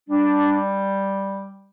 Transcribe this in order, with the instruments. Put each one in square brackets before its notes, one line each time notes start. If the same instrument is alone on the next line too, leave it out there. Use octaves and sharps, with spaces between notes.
[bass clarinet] G3 [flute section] D4